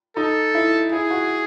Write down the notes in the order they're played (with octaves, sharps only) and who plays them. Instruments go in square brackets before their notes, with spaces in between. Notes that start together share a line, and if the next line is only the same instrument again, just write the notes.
[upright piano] D#4 [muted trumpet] A4
[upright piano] E4
[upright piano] E4 [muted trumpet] G#4
[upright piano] F#4